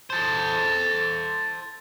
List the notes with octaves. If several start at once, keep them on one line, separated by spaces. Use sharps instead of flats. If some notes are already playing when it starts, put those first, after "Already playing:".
A4 C5